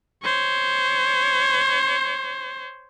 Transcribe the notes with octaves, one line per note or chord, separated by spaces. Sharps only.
C5 C#5